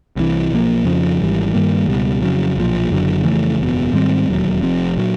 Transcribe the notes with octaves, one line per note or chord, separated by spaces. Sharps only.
C2 C3 E3
B1 A#2 F3 A#3
F2 C#3 F3
G#1 G#2 E3 G3
G2 D#3 G3 A#3
C#2 B2 G3
F2 C#3 F#3
B1 A#2 F3
F#1 F#2 D3 F#3
F2 C#3 E3 A3
F#1 E2 B2
G#2 D#3 G3 C4
E1 D#2 C#3 F#3
F1 F2 C3
A#2 F#3